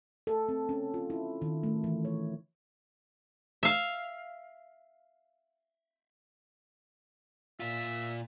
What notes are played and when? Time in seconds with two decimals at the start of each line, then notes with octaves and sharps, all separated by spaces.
0.27 A4
0.49 C4
0.69 C#4
0.94 F4
1.10 E4
1.42 D#3
1.63 A3
1.84 E3
2.05 C#5
3.63 E5 F5
7.60 A#2 F4 E5